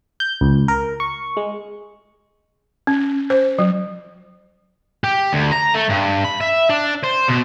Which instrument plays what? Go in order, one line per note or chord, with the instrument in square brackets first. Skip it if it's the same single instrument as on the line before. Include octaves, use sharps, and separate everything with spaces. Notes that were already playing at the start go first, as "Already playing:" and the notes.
[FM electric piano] G6
C#2
A#4
C#6
G#3
[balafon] C#4
C5
F#3
[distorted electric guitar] G4
D2
A#5
A3
G2
B5
E5
D4
C5
B2